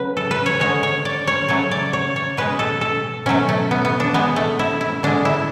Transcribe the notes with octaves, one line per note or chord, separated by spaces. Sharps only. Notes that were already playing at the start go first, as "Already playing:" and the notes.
Already playing: C#3 F#3 B4
A4
B4
C#5
D3 G#3 C#5
C#5
D5
C#5
C#3 F#3 A3 C#5
D5
C#5
C#5
B2 G#3 B4
A4
A4
B2 F#3 A3 C#4
A3
B3
B3
D4
B2 G#3 B3
A3
E4
E4
D3 G#3 D4
E4